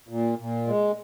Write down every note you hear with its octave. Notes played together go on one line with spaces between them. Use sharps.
A#2
A#2
G#3